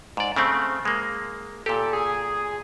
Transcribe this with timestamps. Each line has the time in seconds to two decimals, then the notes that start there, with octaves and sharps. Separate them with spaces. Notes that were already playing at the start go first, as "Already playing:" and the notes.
0.17 G#2 D5
0.36 C#3 A3 C4
0.85 G#3 A#3
1.66 A#2 G4 A4
1.93 G#4